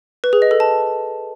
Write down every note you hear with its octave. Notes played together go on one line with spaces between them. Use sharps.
B4
G#4
D#5
A4
A5